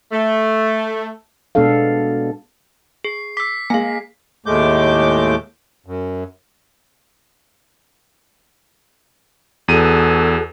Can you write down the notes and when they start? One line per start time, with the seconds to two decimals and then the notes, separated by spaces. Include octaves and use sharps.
0.12 A3
1.55 B2 G#3 B3 D4 A4 F5
3.04 G#4 C7
3.37 D6 E6 B6 C7
3.70 G#3 A#3 F5 G#5
4.46 D#2 A2 G#3 A3 D6 G6
5.86 F#2
9.68 E2 F#4 G#4 A4 D#7